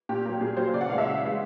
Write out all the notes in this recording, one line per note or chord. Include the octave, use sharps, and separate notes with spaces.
A#2 G4
F#3 A#3
A#2 G#4
F#3 A#3 C5
C#3 D5
F#5
E3 G#3 F5
E5
C#3
E3 G#3